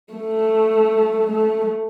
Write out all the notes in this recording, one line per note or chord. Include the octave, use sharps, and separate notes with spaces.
A3
A3